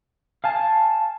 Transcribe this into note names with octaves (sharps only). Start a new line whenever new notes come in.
F5 G#5 A5